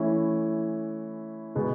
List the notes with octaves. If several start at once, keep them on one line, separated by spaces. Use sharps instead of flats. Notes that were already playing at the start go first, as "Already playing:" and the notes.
Already playing: E3 A3 C#4 E4
B2 G#3 B3